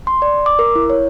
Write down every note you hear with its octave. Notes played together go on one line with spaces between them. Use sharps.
C6
D5
D6
A#4
E4
C#5